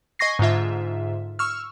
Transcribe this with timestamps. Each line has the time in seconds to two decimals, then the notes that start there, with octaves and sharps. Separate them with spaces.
0.19 D#5 G#5 C#6 A#6 C7
0.39 G#2 D3 F4 E5
1.39 C#6 E6 F6